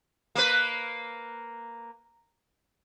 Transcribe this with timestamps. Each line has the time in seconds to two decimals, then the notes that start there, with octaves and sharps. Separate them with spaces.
0.35 A#3 B4